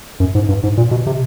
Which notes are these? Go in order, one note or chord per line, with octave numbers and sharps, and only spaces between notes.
F#2
G#2
G2
G#2
A#2
B2
C3